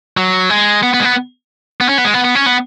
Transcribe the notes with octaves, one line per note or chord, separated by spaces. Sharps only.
F#3
G#3
B3
B3
G#3
B3
B3
C#4
B3
G#3
B3
B3
C#4
B3